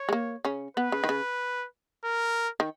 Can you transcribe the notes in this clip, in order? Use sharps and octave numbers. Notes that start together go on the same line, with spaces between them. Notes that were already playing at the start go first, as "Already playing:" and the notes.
Already playing: C#5
G#3
A#3
C#3 C#4
B3 B4
C#3
D#3
C#3
A#4
D#3